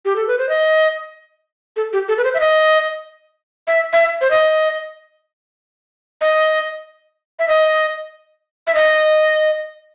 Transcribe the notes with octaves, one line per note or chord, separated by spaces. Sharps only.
G4
A4
B4
C5
D#5
A4
G4
A4
B4
C5
E5
D#5
E5
E5
C5
D#5
D#5
E5
D#5
E5
D#5